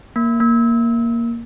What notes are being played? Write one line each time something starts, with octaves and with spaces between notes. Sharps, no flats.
A#3
A#3